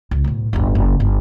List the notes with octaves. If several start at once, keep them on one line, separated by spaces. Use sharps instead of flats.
C#2
B1 A2
D1 G1
F#1
G1